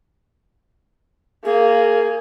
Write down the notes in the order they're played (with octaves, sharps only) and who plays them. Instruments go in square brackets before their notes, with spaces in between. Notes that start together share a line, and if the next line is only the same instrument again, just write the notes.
[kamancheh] A#3 [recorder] G#4